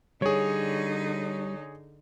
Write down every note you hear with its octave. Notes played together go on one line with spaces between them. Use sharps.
D3 G3 D#4 G#4 C#5